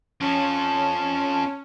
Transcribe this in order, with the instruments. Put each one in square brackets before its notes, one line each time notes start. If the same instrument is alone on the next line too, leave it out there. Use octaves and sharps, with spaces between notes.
[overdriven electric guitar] F2 F3 [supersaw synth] C#4 [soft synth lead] A5